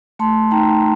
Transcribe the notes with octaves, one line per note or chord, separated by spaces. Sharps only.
A3 A5 C6
D#4 G5 A#5